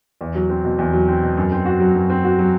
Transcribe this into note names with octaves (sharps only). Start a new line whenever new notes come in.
E2
F#3
C4
B2
E2
F#3
C4
B2
F#2
C4
F#4
F#3
F#2
C4
F#4
F#3